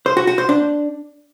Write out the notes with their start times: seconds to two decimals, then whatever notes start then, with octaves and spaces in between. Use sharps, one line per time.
0.06 C5
0.17 F#4
0.27 F#4
0.38 C5
0.49 D4